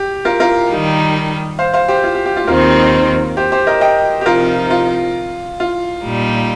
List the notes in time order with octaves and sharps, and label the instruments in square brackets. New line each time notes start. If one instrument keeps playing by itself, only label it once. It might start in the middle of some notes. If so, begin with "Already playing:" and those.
Already playing: [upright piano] G4
F4 A#4
F4 A#4
[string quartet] D#3 G3 D#4
[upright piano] C5 F5
C5 F5
G4 C5
F4
G4
G4
F4
[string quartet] D#2 D#3 C4 D#4 [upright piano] F4 A#4
[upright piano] G4 C5
G4 C5
A#4 D#5
D#5 G5
G4
[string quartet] C3 F3 D#4 [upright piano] F4 A#4
[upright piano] F4
F4
[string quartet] A#2 G3 D#4